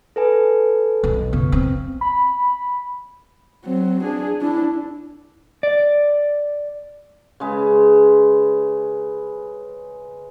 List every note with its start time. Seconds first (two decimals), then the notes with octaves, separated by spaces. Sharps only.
0.16 A4 B4 G#5
1.04 B1
1.33 C#3 B3
1.52 C4
2.01 B5
3.65 F#3 C4
4.03 D4 G#4
4.41 D4 E4
5.63 D5
7.40 C#3 G#3 B4